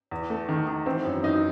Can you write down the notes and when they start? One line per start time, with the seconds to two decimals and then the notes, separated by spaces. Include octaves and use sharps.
0.11 E2
0.30 A3
0.49 D#3
0.67 D#3
0.86 E3 C4
1.05 F#2
1.23 F#2 D#4